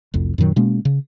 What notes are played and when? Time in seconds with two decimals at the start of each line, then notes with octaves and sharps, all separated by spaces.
0.14 F1 C2 F2
0.38 F#2 A#2 D#3 F#3
0.56 B2 G#3 A#3 C#4
0.85 C#3